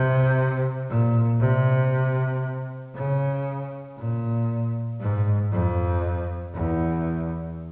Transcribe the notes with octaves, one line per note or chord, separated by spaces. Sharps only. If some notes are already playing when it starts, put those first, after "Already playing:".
Already playing: C3
A#2
C3
C#3
A#2
G#2
F2
E2